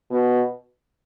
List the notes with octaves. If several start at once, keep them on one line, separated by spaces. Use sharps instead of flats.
B2